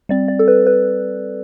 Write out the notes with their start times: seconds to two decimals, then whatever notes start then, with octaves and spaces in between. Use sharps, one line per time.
0.09 G3 C4 D5
0.28 D5
0.39 A4
0.48 B4
0.67 B4